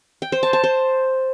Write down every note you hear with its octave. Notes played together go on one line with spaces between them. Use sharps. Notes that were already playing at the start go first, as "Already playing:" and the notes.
G5
C5
A5
A5
C5